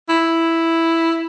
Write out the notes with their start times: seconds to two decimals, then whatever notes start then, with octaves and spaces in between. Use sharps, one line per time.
0.09 E4